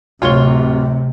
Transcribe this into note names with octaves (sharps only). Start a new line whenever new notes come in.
D1 C3 F4 C#5 G7